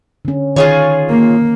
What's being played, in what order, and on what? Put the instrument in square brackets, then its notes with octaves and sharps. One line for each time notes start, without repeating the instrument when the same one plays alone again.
[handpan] D3 C#4
[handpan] D#3 F5 [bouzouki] F4 G#4 C#5
[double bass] A#3